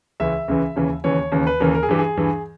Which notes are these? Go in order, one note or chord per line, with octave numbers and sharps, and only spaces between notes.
C#2 C#3 E3 E5
C#2 C#3 E3
D#2 C#3 E3
D#2 C#3 E3 C#5
D#2 C#3 E3
B4
D#2 C#3 E3 A#4
A#4
G#4
G2 E3 G4
G#4
G2 E3